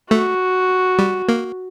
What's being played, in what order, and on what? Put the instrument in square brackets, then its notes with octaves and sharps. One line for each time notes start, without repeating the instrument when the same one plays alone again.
[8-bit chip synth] A3 [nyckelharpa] F#4
[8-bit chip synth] G3
A#3